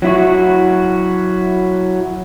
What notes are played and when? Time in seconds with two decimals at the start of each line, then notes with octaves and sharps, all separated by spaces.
0.02 F#3 E4 F#4